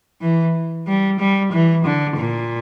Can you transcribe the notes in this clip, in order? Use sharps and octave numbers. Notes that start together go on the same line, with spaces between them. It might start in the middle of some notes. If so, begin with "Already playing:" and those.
E3
G3
G3
E3
D3
A#2